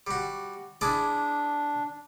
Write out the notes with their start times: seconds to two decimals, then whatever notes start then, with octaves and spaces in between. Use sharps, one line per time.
0.07 G3 F#4
0.81 D4 E4 G#4 D5